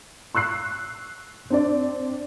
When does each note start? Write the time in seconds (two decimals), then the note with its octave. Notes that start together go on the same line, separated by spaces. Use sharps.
0.35 C#6 E6 F#6 C7
1.50 C4 D4 D5